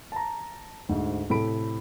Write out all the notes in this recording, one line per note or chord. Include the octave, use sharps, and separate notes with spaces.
A5 A#5
D2 G#2
A2 C3 A4 B5 D7